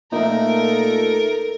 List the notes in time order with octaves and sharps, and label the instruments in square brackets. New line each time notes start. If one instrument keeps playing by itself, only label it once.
[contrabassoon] A#2 [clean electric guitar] A3 D#4 [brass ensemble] A4 [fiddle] A#4